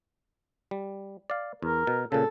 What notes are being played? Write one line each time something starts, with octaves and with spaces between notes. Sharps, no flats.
G3
D5 F5
E2 A#4
B2
A#2 C#3 A4